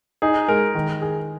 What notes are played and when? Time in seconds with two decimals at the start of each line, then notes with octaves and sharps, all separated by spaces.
0.22 D#4 G#4
0.48 G#3 A#4
0.75 D#3
1.02 G#4